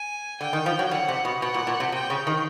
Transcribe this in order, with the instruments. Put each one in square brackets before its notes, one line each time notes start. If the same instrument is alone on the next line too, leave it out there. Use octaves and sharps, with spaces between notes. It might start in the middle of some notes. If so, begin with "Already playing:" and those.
Already playing: [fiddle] G#5
[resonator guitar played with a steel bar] D3 [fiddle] G5
[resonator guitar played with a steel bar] D#3
F3
F#3
[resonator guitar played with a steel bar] D3 [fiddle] F#5
[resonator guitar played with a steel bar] C3
B2
[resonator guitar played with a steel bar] B2 [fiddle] F#5
[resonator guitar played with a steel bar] A#2
A#2
C3
[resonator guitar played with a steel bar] C3 [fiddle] G5
[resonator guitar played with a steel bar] C#3
D#3